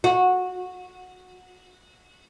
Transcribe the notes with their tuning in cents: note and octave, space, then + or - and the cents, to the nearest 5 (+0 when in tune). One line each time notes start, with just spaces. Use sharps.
F#4 -15